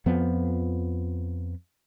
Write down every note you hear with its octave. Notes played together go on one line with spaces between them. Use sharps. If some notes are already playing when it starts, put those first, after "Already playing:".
F2 F3 B3